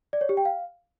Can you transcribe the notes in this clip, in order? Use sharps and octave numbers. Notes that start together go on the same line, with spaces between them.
D5
C#5
G4
G5
F5